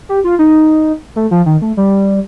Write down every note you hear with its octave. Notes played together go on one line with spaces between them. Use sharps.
G4
F4
D#4
A3
F3
D#3
A3
G3